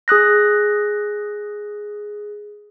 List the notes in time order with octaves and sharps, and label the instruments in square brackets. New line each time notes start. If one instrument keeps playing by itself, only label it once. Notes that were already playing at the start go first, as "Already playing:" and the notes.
[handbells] G#4 D#6 F#6 A#6